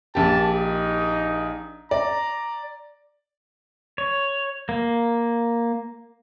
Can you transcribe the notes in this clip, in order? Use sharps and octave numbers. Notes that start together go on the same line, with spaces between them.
A#1 G4 A5
D#4
D5 A#5
C#5
A#3